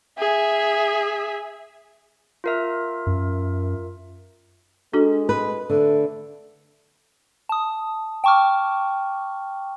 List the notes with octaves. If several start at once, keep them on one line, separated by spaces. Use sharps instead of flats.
G#4 E5
F4 A#4 E5
F#2
G#3 D4 F#4 A4
B4
D3 A3
A5 D#6
G5 A5 C#6 D6 F6